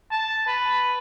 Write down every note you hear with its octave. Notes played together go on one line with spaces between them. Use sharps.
A5
B4